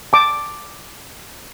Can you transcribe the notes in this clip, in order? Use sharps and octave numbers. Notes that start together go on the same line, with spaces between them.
A5 D6